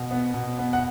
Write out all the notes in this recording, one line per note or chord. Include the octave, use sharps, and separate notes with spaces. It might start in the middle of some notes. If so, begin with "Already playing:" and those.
Already playing: B2
B3
B2
B3
F#5